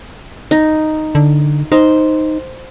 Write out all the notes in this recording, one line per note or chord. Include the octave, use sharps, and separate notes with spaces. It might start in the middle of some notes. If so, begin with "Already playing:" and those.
D#4
D3
D#4 C5